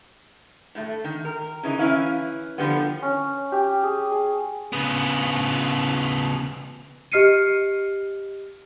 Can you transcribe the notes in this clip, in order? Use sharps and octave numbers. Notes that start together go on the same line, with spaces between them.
A2 A3
D#3
A#4
C#3 E3 D#4
E3 C#4 E4 F5
D3 F3 G3 B3
C#4
G4
G#4
G#4
C#3 B3
G4 D#5 F6 C7 C#7 D#7